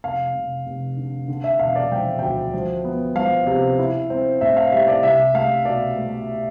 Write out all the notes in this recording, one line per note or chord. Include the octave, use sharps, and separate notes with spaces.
F1 F5
F1
F1
D3
D3
E5
E1 F5
D5
F3 G5
D2 G5
F3
B3
F3 F5
C3
E4
C4
A2 E5
F5
G3 E5
D5
C2 E5
A3 F5
B2 D5
A3